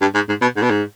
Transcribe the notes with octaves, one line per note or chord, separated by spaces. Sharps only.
G2
G#2
G#2
B2
G#2
B2
G#2